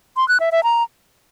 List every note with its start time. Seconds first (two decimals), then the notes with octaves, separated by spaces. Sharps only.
0.17 C6
0.28 F#6
0.40 E5
0.52 E5
0.64 A#5